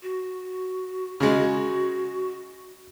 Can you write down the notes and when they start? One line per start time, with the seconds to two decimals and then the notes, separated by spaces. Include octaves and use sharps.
0.03 F#4
1.20 C#3 G#3 F#4